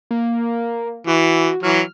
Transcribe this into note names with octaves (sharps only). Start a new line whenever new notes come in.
A#3
E3 F#4
E3 F#3 F6